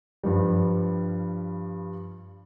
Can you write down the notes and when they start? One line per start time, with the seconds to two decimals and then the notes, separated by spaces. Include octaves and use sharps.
0.24 G2 F3 G3